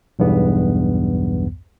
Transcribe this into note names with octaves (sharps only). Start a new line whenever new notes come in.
B1 E2 G2 B3